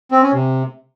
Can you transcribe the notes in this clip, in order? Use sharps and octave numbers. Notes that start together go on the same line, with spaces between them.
C4
C#4
C3